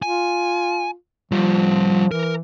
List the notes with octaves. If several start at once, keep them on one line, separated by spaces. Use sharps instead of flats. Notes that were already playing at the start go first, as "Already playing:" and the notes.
F4 G#5
F3 G3 F4
E3 A#4